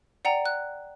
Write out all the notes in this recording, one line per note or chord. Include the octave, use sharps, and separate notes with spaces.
D5 F#5 G5 A#5
F#6